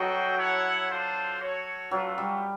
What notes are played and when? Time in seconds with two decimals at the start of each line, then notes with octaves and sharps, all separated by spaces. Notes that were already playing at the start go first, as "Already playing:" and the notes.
Already playing: F#3 F#4 A4 C5 D#5 G5
0.37 E4 A4 C#5 F#5
0.89 D4 F4 A4 C5
1.40 F#4 A4 C#5
1.91 F#3 A3 D4 F4
2.18 G3